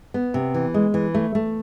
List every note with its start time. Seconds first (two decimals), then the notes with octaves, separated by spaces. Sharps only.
0.14 B3
0.34 C3
0.54 E3
0.74 G#3
0.94 E3
1.15 A3
1.35 A3